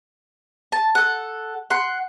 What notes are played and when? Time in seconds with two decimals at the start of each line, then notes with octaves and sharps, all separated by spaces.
0.72 A5
0.95 A4 F#5
1.70 F#5 C6